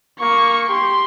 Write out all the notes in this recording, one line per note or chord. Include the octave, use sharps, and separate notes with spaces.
A#3 C#6
G4 C6